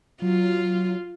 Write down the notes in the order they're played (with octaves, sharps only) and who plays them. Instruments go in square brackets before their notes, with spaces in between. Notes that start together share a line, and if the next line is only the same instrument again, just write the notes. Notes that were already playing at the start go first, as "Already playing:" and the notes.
[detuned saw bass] F#3 [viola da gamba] F4